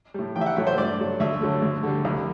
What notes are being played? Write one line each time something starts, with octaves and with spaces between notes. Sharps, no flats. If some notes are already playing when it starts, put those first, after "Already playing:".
A2 G3
A1 G5
E5
F#5
A2 F#3 A3 E5
C5
G2 D5
F#3 A3
D2 E5
D3 F#3 A3
D2
D3 G3
C2